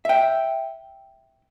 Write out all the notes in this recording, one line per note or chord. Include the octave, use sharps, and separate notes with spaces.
E5 G5